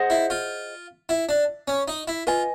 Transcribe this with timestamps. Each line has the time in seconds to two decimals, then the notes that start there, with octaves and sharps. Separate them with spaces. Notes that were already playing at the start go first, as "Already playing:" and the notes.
Already playing: G#4 C5 D#5 F#5
0.10 E4
0.30 F4
1.09 E4
1.29 D4
1.68 C#4
1.88 D#4
2.08 E4
2.27 F4 B4 D#5 G#5